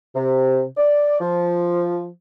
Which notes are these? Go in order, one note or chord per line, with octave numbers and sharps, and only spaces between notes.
C3
D5
F3